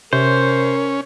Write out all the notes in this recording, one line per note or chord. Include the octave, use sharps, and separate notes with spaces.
C3 C#4 A#4 C5